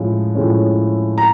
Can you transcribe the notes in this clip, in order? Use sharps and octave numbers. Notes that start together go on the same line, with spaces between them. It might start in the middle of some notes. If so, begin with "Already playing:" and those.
Already playing: A2 F3 G#3 C#4
A2 F3 G#3 C#4
A#5